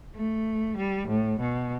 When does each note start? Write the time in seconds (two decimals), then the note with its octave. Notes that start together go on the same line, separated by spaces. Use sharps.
0.15 A3
0.77 G3
1.08 A2
1.40 B2